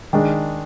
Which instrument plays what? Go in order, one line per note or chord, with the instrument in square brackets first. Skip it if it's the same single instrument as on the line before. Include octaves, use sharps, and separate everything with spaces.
[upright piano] D#3 G#3 D4